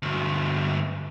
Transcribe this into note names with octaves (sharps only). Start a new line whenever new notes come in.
D2 G2